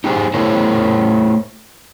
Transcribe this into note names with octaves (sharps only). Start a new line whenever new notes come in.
D#4 G4 G#4 A#4 C5
A3 E4 G#4 A#4 C5 C#5